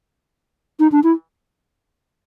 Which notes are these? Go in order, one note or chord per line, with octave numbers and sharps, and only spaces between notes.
D#4
D4
E4